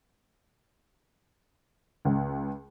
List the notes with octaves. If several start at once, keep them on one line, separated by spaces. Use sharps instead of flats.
C#2